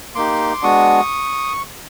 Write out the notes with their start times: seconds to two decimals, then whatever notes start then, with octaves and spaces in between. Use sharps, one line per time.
0.15 A#3 D#4 G4 C6 D6
0.62 G#3 B3 D4 F#4 C#6 D#6